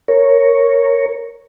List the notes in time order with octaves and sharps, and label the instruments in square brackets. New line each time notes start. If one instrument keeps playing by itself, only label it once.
[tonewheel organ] A#4 C#5